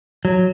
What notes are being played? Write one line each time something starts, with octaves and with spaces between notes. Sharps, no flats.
F#3